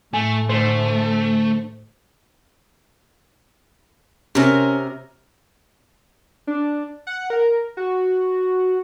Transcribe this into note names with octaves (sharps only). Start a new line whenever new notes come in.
A2 A3 G#5
D2 A3 C5
C3 C#4 A#4
D4
F#5
A#4
F#4